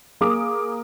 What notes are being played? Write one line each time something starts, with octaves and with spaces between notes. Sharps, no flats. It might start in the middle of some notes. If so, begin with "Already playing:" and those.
A#3 G#4 D6 D#6